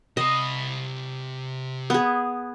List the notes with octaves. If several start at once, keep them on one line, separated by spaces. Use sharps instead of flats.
C3 D#5 B5
B3 G#4